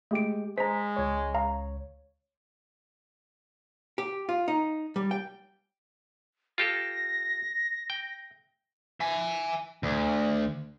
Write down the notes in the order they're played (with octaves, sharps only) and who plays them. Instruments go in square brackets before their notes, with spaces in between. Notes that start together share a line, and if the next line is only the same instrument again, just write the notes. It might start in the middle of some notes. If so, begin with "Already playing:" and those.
[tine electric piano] G#3 G4 [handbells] A3 D7
[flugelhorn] G#3 [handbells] C5 A#5 [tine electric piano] B6
[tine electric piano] C#2 C#5
[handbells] F5 A#5
[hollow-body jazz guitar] G4
F4
D#4
G3
G5
[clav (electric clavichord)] F4 G4 A4 [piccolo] A#6
[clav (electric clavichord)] G5
[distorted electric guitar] E5 G#5
D2